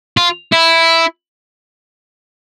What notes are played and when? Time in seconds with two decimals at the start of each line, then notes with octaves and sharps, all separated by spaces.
0.17 F4
0.53 E4